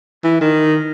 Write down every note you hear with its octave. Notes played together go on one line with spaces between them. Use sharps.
E3
D#3